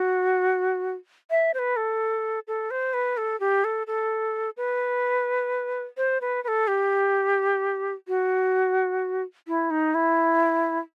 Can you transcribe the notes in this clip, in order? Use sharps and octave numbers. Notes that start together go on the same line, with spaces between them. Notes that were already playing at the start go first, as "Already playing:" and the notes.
Already playing: F#4
E5
C5
B4
A4
A4
C5
B4
A4
G4
A4
A4
B4
C5
B4
B4
A4
G4
F#4
E4
D#4
E4